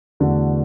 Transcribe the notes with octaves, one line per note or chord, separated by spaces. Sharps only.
E2 D3 A3 F#4